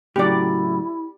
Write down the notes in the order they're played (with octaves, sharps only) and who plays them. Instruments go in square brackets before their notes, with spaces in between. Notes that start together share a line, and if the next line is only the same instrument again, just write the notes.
[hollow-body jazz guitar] A2 C#3 F#3 [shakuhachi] E4 [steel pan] G4 D5